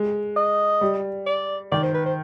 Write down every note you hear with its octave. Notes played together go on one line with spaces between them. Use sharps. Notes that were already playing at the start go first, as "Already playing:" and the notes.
Already playing: G#3
D#5
G3
D5
D#3 D5
C5
B4
C5